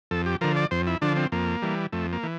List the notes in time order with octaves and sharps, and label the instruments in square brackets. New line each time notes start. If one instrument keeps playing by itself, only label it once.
[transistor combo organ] F2 A4
G4
D3 F3 A#4
D5
F2 C5
E4
D3 F3 D4
C4
F2 A#3
E3 G3
F2 A3
A#3
E3